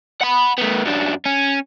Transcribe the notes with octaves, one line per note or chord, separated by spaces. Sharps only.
F#5 B5
A3 B3
F#2 D4
C#4